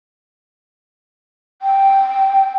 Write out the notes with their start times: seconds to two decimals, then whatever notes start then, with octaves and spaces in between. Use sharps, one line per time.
1.62 G5